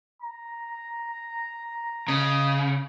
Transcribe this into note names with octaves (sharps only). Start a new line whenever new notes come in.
A#5
C#3 D#5